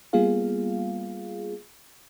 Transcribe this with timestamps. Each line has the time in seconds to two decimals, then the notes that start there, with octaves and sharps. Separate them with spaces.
0.13 G3 A#3 B3 F4 G#4 F5